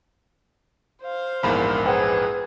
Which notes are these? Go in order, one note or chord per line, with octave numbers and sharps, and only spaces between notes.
C5 F5
A#1 E2 G#2 A#4 B5
G#4 B4 C5 F#5 G5